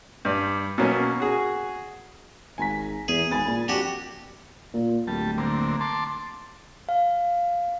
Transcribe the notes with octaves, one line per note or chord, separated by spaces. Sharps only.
G2 D5
B2 F#3 A#3 C#4
F#4 G#4
G#1 G#5 A#5 B6
E2 G#4
G#1 G#5 B5 A6
A#2
F2 D4 F#4 G4
A#2
D1 G3 A5
D3 A#3 C4
A5 C6 D6
F5